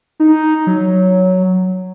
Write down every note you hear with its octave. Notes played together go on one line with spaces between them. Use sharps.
D#4
F#3